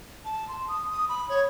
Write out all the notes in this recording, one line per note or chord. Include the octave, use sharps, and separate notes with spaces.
A5
C6
D#6
D#6
B5
C#5